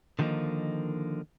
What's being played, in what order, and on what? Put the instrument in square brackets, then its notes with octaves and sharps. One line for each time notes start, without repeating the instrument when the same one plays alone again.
[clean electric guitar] D3 D#3 F3 G3 A#3 D#4